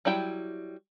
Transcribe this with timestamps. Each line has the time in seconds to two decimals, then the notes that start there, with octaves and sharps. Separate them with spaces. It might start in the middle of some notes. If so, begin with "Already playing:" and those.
0.05 F#3 G3 E4 G5